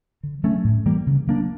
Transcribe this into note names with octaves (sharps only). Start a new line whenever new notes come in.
D3
F#3 A3 C#4
A2
E3 G3 A#3
C#3
F#3 A#3 D4